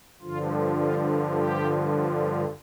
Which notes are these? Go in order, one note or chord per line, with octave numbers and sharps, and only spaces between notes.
G2 D3 F3 F4
F4
G4